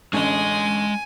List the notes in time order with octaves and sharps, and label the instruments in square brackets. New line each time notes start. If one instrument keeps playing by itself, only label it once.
[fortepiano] A1 D3 C#4 [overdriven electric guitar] G#3 D#5 [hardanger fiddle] G#5